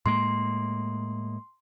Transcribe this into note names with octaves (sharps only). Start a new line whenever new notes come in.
A2 G#3 A#3 C6